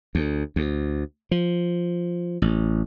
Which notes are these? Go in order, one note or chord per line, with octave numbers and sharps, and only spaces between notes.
D2
D2
F3
A1